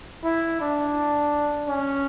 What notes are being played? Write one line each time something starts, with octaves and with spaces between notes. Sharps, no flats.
E4
D4
C#4